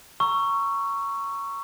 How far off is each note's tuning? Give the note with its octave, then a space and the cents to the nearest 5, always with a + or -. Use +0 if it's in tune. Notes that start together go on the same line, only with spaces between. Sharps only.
A#5 +0 C#6 +0 E6 +30